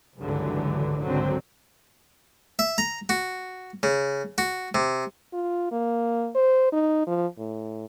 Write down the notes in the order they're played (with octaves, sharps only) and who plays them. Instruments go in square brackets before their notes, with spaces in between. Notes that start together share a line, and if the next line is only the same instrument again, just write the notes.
[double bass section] G#1 C#2 G2 D3 E3 F#3
G#1 C#2 D3 F#3 C4
[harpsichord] E5
A#5
F#4
C#3
F#4
C3
[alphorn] F4
A#3
C5
D#4
F3
A2